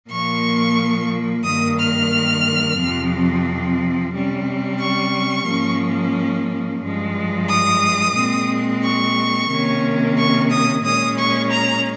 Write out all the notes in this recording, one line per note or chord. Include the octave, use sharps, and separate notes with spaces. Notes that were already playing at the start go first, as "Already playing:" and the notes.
A#2 F3 A#3 C#6
G2 D#3 A#3 D#6
F6
F2 C3 F3 C4
C3 G3 C#4
C#6
G#2 F3 A#3 C#4
G2 F3 G#3
D#6
A#2 G#3 C4
C#6
C3 D#3 A#3 C#4
C#6
D#6
A#2 G#3 C#4 D#6
C#6
A#5